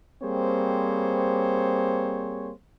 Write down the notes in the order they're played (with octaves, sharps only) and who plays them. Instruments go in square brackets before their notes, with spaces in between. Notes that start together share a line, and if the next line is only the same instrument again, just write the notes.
[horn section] G3 A#3 C4 G#4 C5 C#5